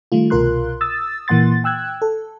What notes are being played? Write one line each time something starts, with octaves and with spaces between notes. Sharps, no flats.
D#3 G3 A3 F4
C2 B2 F4 A#4 C6 F#6
D#6 E6 A6
A#2 E3 A#3 F#5 C6 A6
G5 E6 F#6 G#6
A4